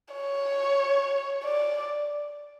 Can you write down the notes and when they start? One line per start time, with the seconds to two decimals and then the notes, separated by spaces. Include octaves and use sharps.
0.15 C#5
1.44 D5